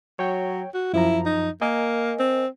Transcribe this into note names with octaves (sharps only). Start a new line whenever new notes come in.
F#3 C#5 G5
F#4
F#2 F3 E4 A#5
D#4
A#3 A#4 D#5 G#5
C4